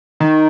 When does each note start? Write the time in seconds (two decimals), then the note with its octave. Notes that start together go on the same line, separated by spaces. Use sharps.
0.20 D#3